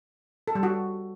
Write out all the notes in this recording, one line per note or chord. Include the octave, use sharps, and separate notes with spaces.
A4
G3
F#4